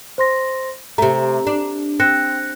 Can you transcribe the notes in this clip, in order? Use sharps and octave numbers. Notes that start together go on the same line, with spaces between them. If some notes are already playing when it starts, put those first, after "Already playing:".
C5 C6 A#6
C3 A3 A#5
D4
C4 F#6 A#6 C#7